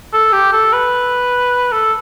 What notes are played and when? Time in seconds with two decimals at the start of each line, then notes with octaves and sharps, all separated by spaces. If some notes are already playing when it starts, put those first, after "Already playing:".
0.13 A4
0.32 G4
0.53 A4
0.73 B4
1.72 A4